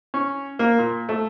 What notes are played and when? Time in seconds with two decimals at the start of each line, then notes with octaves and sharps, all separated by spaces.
0.14 C#4
0.59 A#3
0.79 A#2
1.09 A3